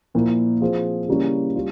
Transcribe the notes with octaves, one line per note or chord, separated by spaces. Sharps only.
A#2 F3 A#3 E4
F3 C4 F4 G#4
C#3 G3 A#3 C#4 E4
G3 C#4 F4